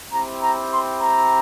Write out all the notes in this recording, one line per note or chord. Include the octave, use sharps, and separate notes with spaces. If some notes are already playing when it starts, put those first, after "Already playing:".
C4 E4 G4 A#5
A#5
C6
A#5